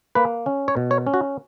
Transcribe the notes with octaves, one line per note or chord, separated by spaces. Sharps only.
A#3 B4
C#4
C#5
B2
C#5
C#4
F#4